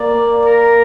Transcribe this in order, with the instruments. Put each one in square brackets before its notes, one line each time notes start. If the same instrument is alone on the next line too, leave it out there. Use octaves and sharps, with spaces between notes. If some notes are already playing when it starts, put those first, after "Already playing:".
Already playing: [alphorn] A#3 [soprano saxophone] D5
[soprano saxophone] A#4